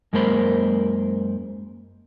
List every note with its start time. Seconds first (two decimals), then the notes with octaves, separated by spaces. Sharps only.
0.13 F#2 G#3 A#3 A#4 C5 B5